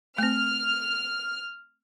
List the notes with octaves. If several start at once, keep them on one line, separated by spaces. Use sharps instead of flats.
A3 C4 F6